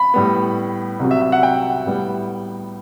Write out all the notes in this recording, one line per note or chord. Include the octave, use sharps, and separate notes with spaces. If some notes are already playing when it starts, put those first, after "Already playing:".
Already playing: B5
A2 G3 B3
C2 C3 F#3
E5
E5
F#5
G5
A2 G3 B3